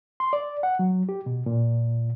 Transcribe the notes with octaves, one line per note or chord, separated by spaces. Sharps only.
C6
D5
F#5
F#3
G4
B2
A#2